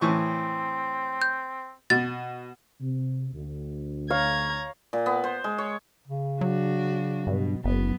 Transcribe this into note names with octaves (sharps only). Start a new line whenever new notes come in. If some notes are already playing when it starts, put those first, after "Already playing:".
A2 E3 C4 C#6
G6
B2 A6
C3
D2
C#5 F5 A#5 G#6
A#2
B3
C5
G#3
C#5
C#3
F#3 D4 F#4
G2 B2
F#1 F#2 B3